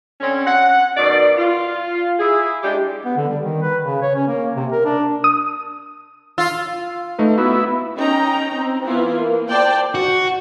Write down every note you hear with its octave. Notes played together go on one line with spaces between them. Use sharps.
D3 C4 C#4
F#5
B2 D#3 D5
F4
E4 G#4
G3 G#3 D4 G4
B3
D3
G3
D#3
B4
C#3
C#5
C#4
A#3
C3
A#4
D4
D#6
F4 E6
A3 D#4 B4
B3 E4 F#4
C#4 D#4 G5 A#5
C4
E3 B3 E4 F4
A#3
C5 D5 G5 A5
F#4